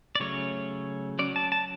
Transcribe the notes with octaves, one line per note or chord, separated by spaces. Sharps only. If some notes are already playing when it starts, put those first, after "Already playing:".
D5
C#3 F#3 A3 C#4 C#5
F#3 C#4 D5
A5
A5